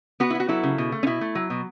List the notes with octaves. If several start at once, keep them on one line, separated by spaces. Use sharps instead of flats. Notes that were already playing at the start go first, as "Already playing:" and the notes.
B3 F#4 B4
E4
B3 F#4
F#3 E4 A4
C#3
B2
A3
C#4
B2 E4
A3
F#3
B2